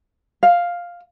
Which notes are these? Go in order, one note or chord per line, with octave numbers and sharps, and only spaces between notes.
F5